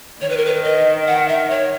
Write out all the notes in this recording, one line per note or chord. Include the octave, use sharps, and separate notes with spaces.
D#3 C#5
B4
A#4
B4
D#5
F#5
E5
C#5